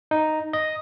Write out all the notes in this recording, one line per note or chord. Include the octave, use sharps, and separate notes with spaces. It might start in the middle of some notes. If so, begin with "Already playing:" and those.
D#4
D#5